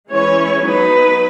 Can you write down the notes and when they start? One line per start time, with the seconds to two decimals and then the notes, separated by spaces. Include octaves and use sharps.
0.11 E3 G#3 C#4 E4 C#5
0.65 F#3 B3 D#4 B4